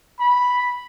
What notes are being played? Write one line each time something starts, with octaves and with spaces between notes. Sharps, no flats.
B5